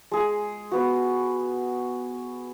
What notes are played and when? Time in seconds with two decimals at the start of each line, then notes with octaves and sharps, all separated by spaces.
0.12 G#3 G#4
0.72 B3 F#4